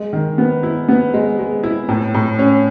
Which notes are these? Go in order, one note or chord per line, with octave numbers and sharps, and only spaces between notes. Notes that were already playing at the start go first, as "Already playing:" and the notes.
Already playing: G#3
D#3
B3
E4
B3
G#3
G#3
E4
A2
A2
C#4